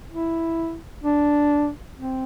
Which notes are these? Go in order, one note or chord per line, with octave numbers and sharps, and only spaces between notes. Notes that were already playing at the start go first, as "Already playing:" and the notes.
E4
D4
C4